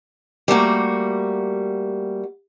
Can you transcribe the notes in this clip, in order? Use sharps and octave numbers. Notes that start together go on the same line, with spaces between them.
G3 A3 A#3 F#4